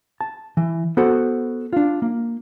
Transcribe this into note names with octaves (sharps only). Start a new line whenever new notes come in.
A5
E3
B3 F#4 A4 C5 F#5
D4 F4
A#3